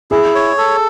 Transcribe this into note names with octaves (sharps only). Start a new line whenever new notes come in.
E4 G#4
C#5
A4